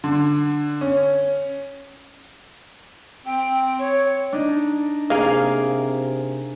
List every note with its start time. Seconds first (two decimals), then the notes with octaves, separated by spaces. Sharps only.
0.04 D3
0.81 C#4
3.26 C4 G5
3.79 C#5
4.32 D4 D#4
5.10 C3 A#3 G#4 F5